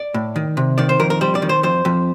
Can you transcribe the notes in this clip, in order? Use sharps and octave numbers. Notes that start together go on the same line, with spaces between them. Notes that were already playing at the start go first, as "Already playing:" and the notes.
Already playing: D5
A2
D#3
C3
D#3 D5
C5
F2 A#4
A#4
G3 C5
D5
D#3
C5
F2 C5
F2